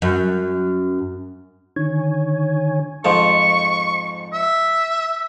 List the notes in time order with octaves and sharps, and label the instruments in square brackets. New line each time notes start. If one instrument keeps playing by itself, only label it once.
[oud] F#2
[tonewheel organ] D3 D#3 C#5 G#5
[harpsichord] F2 G#2 F3 [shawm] C#6
[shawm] E5